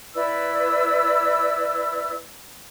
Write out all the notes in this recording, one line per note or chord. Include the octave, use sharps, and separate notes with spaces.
E4 B4 D5 E6